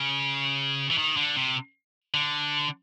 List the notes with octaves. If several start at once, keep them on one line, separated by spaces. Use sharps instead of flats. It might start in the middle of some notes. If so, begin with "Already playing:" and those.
Already playing: C#3
E3
D#3
D3
C3
D3